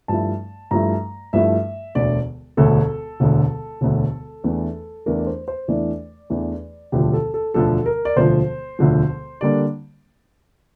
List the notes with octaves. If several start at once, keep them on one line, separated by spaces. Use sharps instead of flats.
G2 F3 A3 E4 A5
G2 F3 A3 E4 A#5
G2 F3 A3 E4 E5
E1 D2 D3 D5
E1 D2 D3 A4
E1 D2 D3
E1 D2 D3
E2 E3 A3 D4
E2 E3 A3 D4 A#4
D5
C5
C5
E2 E3 A3 D4 D5
E2 E3 A3 D4
E1 D2 D3 F3 G4
A4
A4
E1 D2 D3 F3 A4
A#4
D5
E1 D2 D3 F3 C5
E1 D2 D3 F3
D3 G3 A#3 D4 D5